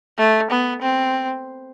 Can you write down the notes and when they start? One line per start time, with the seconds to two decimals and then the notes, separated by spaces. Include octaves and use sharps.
0.18 A3
0.51 B3
0.82 C4